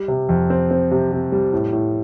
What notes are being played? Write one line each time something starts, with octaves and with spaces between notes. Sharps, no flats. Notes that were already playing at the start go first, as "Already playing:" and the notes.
Already playing: G3
C3
F2
C4
C4
C3
C3
G3
A2
A2